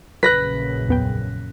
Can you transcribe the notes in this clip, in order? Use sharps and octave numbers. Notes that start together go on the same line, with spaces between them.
A#1 F#2 C#3 B4 F#6 A#6 B6
E2 B3 G5